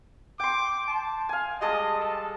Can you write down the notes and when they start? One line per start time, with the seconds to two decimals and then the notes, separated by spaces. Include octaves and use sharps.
0.40 G5 C6 D6
0.88 A5
1.29 F5 G#5
1.61 G3 G#3 D#5 A5
2.00 A4